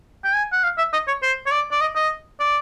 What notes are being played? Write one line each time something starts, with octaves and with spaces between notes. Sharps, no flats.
G5
G#5
F#5
F5
E5
D#5
C#5
C5
C#5
D5
D5
D#5
D#5
D5